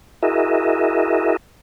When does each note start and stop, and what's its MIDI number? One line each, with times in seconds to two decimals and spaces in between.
0.23 1.37 64
0.23 1.37 66
0.23 1.37 68
0.23 1.37 70
0.23 1.37 75
0.23 1.37 76